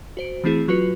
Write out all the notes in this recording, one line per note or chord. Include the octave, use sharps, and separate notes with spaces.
F#4 C5 D7
E3 A3 C4 E4 G#4
F#3 F4 F#4 B4 C#7